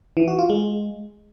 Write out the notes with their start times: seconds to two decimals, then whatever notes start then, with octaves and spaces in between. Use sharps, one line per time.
0.17 E3
0.28 F#4
0.39 F4
0.50 G#3